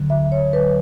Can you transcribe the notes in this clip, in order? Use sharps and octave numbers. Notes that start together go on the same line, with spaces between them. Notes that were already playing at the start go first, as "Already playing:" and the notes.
Already playing: D2 D3 F#3
E5
C#5
D2 D3 F#3 B4